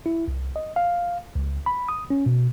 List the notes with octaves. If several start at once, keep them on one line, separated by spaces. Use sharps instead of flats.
E4
C2
D#5
F5
C#2
B5
D#6
C#4
B2